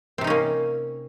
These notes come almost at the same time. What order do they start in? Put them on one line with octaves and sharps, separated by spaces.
C4 C3 D#4 C#4 A#3